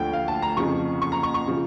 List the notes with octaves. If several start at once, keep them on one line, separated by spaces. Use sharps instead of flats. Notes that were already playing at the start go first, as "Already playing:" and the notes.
Already playing: D2 D3 F3 G5
F5
A5
A#5
F2 C#3 F3 C#6
C#6
A#5
C#6
C#6
C#3 F3